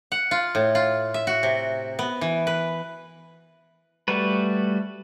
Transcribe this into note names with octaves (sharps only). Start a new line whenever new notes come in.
F#5
F4
A2
F4
E5
F#4
C3
B3
E3
B4
G3 A3 F#4 B4